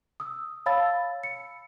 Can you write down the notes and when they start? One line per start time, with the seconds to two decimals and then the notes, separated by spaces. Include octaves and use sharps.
0.20 D#6 E6
0.66 C#5 F5 A5 B5 E6 A6
1.24 C#7